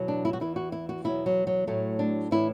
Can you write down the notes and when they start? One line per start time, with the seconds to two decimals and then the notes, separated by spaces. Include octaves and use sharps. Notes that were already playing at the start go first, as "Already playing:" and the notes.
Already playing: E2 B2 F#3
0.08 D4
0.25 E4
0.33 F#4
0.40 E2 E3 E4
0.56 F#4
0.72 E4
0.89 F#4
1.04 E2 B2 F#3 E4
1.26 F#3
1.47 F#3
1.67 A2 F#3 A3
1.99 D4
2.31 A2 E3 E4